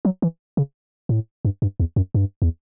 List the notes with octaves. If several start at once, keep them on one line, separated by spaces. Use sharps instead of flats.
F#3
E3
C#3
A2
G2
G2
E2
F#2
G2
E2